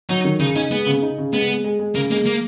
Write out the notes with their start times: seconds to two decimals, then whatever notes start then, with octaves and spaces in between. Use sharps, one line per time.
0.09 F#3 D#4
0.24 D#3
0.40 C#3 D#4
0.55 C#4 D#4
0.71 G#3 B3
0.86 C#3
1.02 D#4
1.18 C#3
1.33 G#3 B3
1.48 G#3
1.64 G#3
1.79 G#3
1.95 C#3 A#3
2.11 G#3 A#3
2.26 A#3